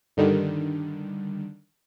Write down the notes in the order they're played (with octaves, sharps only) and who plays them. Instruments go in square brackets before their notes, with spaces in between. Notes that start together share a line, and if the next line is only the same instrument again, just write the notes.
[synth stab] G2 D3 D#3 G3